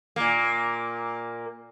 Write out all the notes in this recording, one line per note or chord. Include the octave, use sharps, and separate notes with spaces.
A#2 A#3